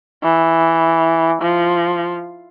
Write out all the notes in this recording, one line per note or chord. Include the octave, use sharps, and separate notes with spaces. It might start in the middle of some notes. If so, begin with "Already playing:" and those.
E3
F3